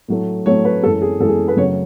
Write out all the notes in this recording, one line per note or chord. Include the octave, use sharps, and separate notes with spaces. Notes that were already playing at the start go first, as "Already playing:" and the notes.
A2 F#3 A3
A2 F#3 A3 C#5
B4
F#2 E3 G#3 A4
G#4
F#2 E3 G#3 A4
G#4
B4
F#2 C#3 F#3 A3 C#5